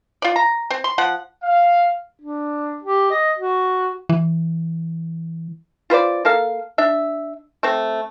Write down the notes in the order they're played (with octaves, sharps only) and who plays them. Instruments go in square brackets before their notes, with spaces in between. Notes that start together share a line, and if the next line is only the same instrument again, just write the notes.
[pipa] F4 D5
A#5
C4
C6
F3 F#5
[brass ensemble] F5
[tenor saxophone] D4
G4
D#5
F#4
[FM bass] E3
[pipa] F4 B4 C5 D5
A#3 A4 F5
D4 E5
A3 C4